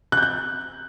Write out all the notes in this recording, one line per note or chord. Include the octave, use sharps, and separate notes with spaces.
F#6
G6
F#6